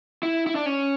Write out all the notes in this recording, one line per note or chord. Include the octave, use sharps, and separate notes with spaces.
E4
E4
D4
C#4